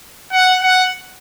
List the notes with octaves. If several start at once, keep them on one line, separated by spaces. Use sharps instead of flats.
F#5
F#5